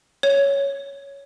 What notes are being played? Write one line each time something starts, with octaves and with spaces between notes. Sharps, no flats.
C#5